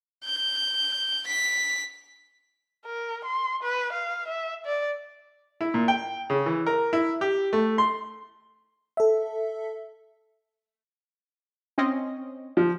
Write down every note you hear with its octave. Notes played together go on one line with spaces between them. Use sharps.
G6
B6
A#4
C6
B4
F5
E5
D5
E4
A#2
G5
C#3
E3
A#4
E4
G4
A3
C6
A4 E5
C4 C#4 D#5
F3